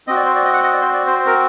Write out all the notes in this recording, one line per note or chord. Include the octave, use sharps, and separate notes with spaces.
C4 F#4 D#5
D5
C5
D5
D#5
F#5
D#5
D5
C5
D5
C5
C5
A#4